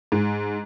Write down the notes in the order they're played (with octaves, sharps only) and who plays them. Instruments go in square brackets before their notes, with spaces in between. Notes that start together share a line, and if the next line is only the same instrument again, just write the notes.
[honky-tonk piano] G#2